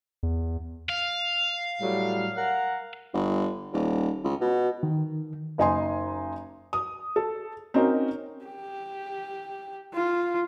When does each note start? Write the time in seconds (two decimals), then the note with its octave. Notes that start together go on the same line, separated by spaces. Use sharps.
0.23 E2
0.89 F5
1.81 A2 F#3 G3
2.36 A#4 F#5
3.13 G1
3.73 D#1
4.24 C#2
4.41 B2
4.83 D#3
5.58 F#1 D#4 G#5 C6
6.73 D#6
7.16 A4
7.74 C4 C#4 D#4 F#4 A#4
8.45 G4
9.94 F4